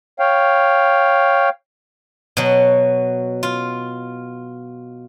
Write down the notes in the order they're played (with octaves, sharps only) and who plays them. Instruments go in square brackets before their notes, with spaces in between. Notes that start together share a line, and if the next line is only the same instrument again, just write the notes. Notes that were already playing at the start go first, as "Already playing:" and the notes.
[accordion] C#5 F5 G5
[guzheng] B2 F#3
F4